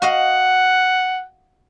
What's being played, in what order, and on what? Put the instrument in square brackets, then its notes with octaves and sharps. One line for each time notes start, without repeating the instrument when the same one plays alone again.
[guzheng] F#4 D#5 F5 [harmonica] F#5